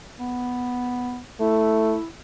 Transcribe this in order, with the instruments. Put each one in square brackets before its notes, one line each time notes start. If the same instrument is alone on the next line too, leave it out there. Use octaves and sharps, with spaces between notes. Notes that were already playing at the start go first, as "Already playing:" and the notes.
[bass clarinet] B3
[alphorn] A3 [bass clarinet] E4